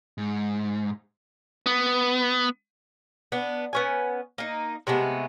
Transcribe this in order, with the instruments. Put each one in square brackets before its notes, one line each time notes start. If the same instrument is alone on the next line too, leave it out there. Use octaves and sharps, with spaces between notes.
[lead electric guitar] G#2
B3
[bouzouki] B3 D4
B3 C#4 G#5
A#3 D#4
C3 G#3 A3 B3